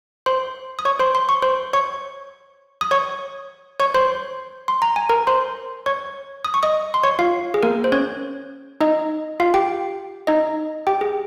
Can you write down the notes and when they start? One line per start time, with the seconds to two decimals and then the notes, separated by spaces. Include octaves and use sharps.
0.26 C5 C6
0.79 D#6
0.85 C#5 C#6
0.99 C5 C6
1.15 C6
1.29 C#6
1.42 C5 C6
1.73 C#5 C#6
2.81 D#6
2.91 C#5 C#6
3.80 C#5 C#6
3.94 C5 C6
4.68 C6
4.82 A#5
4.96 G#5
5.09 A#4 A#5
5.27 C5 C6
5.86 C#5 C#6
6.45 D#6
6.54 C#6
6.63 D#5 D#6
6.94 C6
7.03 C#5 C#6
7.19 F4 F5
7.54 G#4
7.63 A#3 A#4
7.84 C5
7.92 C#4 C#5
8.81 D#4 D#5
9.40 F4 F5
9.54 G4 G5
10.27 D#4 D#5
10.87 G4 G5
11.01 G#4